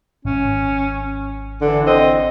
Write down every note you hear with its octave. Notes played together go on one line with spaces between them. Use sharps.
G#1 C#4
D3 E3
C4 D#5